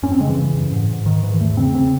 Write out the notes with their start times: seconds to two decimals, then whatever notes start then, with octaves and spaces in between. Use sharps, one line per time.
0.03 F#2 C#4
0.12 C4
0.20 C#3 G#3
0.28 E3
0.38 C#3
0.54 F#2
0.72 G#2
0.89 G#2
1.06 G#2 D#3
1.23 G#2 E3
1.40 E2 A3
1.57 C#3 C4
1.74 C#3 C4